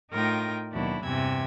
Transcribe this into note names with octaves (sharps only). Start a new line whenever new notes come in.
A2 D#4 F4 A#4 G5 A#6
D#2 B2 F#3 D4 E4
E2 G2 C3 E3 E6 G#6